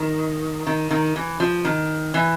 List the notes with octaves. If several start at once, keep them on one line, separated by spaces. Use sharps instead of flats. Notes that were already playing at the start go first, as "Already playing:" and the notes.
Already playing: D#3
D#3
D#3
E3
F3
D#3
E3